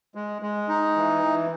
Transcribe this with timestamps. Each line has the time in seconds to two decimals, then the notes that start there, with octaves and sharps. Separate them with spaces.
0.15 G#3
0.42 G#3
0.68 D#4
0.97 E3
1.22 E3